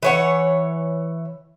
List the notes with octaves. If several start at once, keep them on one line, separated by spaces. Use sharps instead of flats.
E3 C#5 F#5